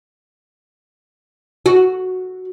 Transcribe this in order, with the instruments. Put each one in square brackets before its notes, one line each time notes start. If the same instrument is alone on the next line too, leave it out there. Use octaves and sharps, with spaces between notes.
[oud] F#4